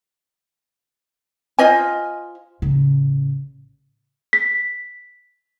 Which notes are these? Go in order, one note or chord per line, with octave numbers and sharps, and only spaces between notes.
F4 C5 D#5 G#5
A1 C#3
B6